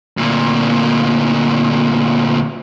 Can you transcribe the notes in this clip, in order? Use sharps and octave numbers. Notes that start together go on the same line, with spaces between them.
D2 A#2